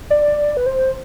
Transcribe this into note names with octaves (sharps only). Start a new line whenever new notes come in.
D5
B4
C5